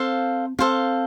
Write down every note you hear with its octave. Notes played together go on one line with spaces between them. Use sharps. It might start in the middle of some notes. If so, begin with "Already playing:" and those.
Already playing: C4 A4 C5 F5
C4 A4 C5 F5